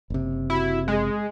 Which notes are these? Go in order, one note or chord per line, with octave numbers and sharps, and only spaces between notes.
F#1 C3
E4 F#4
G#3 G#4